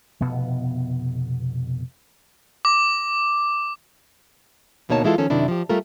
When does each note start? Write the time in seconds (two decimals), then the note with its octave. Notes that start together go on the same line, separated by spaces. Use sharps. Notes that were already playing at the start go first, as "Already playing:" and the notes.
0.20 F1 B2 B3
2.65 D6
4.89 D2 B2 A#3 D#4 C#5 A5
5.04 E3 G#3 E4 F4 A4
5.18 D#3 F3 C#4 A4
5.30 F#2 C3 D#3 D4 E4
5.48 F3 G4
5.69 G3 A3 F4 A4 A#4